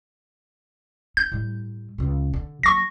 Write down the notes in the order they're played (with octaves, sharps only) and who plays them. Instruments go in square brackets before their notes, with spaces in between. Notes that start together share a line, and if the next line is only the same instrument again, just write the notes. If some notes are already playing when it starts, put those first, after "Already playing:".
[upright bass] D#4 [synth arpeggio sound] G6
[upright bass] A2 G3
C#2 C#3
D3
[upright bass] F#3 A#3 [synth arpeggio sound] C#6 A#6